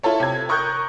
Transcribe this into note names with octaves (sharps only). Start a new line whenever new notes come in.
E4 F4 A4 C#5
C3 G#6
A#4 C#6 D#6 F#6 G6